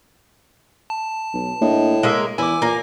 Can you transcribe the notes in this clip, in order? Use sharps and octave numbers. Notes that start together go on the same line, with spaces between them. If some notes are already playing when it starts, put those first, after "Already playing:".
A5
B1
A2 A#3 D4 D#5
G#3 A#3 E5 F5
E2 E4 G#5 D6
A#2 A#3